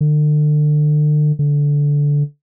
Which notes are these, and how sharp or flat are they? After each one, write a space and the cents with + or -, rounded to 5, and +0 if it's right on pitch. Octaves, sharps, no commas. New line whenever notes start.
D3 +35
D3 -15